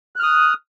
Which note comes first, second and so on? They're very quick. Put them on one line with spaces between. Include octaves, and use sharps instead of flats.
F#6 F6 D#6